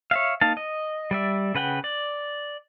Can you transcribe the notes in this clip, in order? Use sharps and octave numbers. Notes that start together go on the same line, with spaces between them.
C#5 E5 F5
A#3 D#4 F5 A5
D#5
G3 D5 E5
C#3 B4 F#5 G5
D5